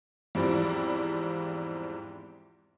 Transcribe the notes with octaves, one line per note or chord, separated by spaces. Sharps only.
E2 G#2 F3 G3 C4 E4